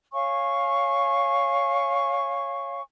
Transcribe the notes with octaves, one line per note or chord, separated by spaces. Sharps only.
C#5 F5 G#5 C#6